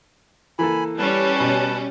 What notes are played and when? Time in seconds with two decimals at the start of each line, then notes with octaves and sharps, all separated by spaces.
0.59 E3 A#3 A4 G#5 B5
0.98 G3 C#4 B4 A5
1.40 B2